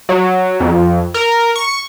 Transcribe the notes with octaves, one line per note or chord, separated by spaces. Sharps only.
F#3
F2
A#4
C#6